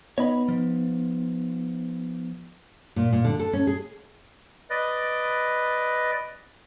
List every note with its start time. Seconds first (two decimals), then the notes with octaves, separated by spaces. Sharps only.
0.18 B3 D#4 C#5 D#5 B5
0.49 F3
2.96 A#2
3.12 A#2
3.25 D3
3.39 A4
3.53 C#4
3.67 G#4
4.70 B4 D5 D#5